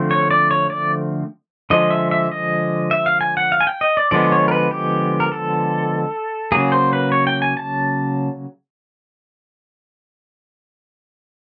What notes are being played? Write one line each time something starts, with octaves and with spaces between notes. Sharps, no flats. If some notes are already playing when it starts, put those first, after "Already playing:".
Already playing: D3 F3 A3 C4
C#5
D5
C#5
D5
D3 F3 G#3 D#5
E5
E5
D#5
E5
F5
G#5
F#5
F5
G#5
G5
D#5
D5
D3 F3 G#3 B3 D5
C#5
A#4
B4
G4
A#4
A4
C#3 F#3 A#3 G#4
C5
B4
C#5
G5
G#5
A5